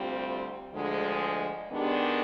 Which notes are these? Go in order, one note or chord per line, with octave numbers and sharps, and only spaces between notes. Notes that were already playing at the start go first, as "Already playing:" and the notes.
Already playing: D2 C3 G3 C4 F4
D2 D3 F3 G#3
D#3 G#3 B3 D4 G4